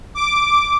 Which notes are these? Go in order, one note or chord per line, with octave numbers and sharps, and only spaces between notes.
D6